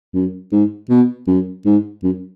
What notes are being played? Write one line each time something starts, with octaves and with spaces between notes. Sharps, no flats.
F#2
G#2
B2
F#2
G#2
F#2